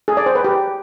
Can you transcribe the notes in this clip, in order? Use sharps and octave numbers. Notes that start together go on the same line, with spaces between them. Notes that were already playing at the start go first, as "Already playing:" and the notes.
G#4
D5
C5
B4
G4